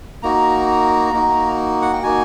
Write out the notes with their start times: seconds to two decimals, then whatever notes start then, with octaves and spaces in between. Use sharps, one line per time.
0.23 A#3 D#4 F#4 A#5
1.13 A#3 D#4 F#4
1.82 F#5
1.93 G5
2.03 A#3 D#4 F#4 G#5